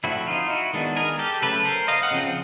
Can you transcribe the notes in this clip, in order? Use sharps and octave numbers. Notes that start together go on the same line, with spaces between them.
D3 F3 A3 C4 E4 F#4
D#4 F4
E4 F#4
D#3 G#3 B3 D4
G#4 A#4
G4 A4
C#3 F#3 A3 A4 B4
A#4 C5
D#5 F5
F#5
C#3 F3 C4